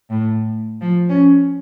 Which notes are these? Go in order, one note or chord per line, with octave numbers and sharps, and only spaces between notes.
A2
F3
C#4